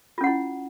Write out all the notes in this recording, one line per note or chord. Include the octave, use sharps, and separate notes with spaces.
C#4 E4 F4 F#5